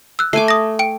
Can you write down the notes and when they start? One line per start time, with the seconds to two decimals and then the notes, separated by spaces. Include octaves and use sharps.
0.19 E6 F#6
0.33 A3 G#5 D6 C7 D#7
0.48 D#6 A#6
0.79 G5 D7